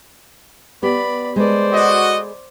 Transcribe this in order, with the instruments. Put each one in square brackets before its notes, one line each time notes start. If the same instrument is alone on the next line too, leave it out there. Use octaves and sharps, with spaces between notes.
[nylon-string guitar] B3 G4 [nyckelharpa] D5 B5
[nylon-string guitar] G#3 A4 B4 [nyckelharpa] C5 D5
[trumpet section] F#4 D#5